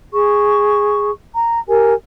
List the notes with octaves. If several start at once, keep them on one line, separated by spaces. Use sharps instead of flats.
G#4 C#6
A#5
G4 A#4 G#5